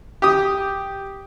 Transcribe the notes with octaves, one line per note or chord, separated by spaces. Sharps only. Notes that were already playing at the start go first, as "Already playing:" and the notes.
G4 D#6